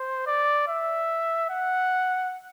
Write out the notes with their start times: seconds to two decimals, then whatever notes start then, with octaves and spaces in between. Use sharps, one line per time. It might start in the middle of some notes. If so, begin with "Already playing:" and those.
Already playing: C5
0.27 D5
0.68 E5
1.50 F#5